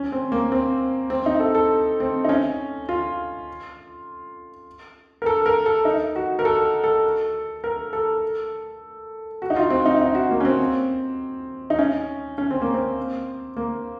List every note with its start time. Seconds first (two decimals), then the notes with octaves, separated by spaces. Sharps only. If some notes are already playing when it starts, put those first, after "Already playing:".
Already playing: C#4
0.12 C4
0.32 A#3
0.52 C4
1.10 C4
1.26 D#4
1.40 A4
1.55 A4
2.00 C4
2.25 D#4
2.29 C#4
2.89 F4
5.22 A#4
5.26 A4
5.46 A#4
5.66 A4
5.85 D#4
6.16 F#4
6.39 A#4
6.45 A4
6.84 A4
7.64 A#4
7.93 A4
9.42 F#4
9.50 D#4
9.56 F4
9.70 C4
9.86 D#4
10.01 D#4
10.15 F#4
10.31 A#3
10.40 C#4
10.45 C4
11.70 D#4
11.79 C#4
12.38 C#4
12.51 C4
12.62 A#3
12.74 C4
13.57 A#3